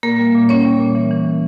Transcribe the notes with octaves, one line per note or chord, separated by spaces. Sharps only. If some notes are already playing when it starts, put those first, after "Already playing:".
A#2 A#3 A#4
G3
A#2
A#2 C#4 C#5
G3
A#2
E3
E3